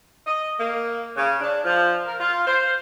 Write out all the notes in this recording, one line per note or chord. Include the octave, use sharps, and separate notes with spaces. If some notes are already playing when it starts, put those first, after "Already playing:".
D#5
A#3
C#3
D4
F3
A#4
F4
C5